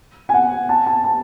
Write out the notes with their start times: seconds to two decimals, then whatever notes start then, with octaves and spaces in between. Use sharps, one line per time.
0.29 G#5
0.34 F#5
0.69 A5
0.86 A5
1.04 A5